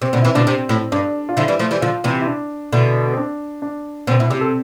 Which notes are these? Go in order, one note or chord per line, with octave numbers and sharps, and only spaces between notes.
C3 C4
B2 D3
C3 E3 E4
B2 D3 D4
C3 C4
A2
G2 D4
F4
D3 F3 E4
E3 G3
F3 A3
E3 G3
D3 F3 F4
C3 E3
E4
D4
B2 D3 E4
C4
D4
D4
B2 D3 C4
B2 E4
C3 G4
A4